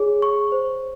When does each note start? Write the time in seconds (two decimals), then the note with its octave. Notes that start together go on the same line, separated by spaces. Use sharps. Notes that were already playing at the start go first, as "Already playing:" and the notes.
Already playing: G#4 C#5
0.22 C#6
0.52 C5